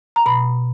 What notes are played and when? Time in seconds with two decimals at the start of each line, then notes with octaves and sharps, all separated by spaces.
0.16 A#5
0.26 B2 B5